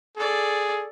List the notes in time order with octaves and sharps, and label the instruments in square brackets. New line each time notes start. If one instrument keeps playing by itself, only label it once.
[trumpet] G#4 [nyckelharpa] A4 D5